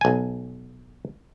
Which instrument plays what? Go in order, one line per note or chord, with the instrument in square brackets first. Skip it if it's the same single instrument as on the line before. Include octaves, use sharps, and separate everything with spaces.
[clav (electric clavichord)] B1 G#5